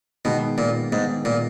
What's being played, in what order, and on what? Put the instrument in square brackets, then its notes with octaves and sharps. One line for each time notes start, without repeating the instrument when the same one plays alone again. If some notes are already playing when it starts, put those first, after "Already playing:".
[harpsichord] B2 [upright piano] D#3 G#3 B3
[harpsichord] A#2
[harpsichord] G#2 [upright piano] D#3 G#3 B3
[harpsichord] A#2